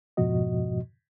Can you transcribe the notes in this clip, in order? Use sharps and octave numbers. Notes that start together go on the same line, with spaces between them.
F2 G#2 B2 F3 F#4 D#5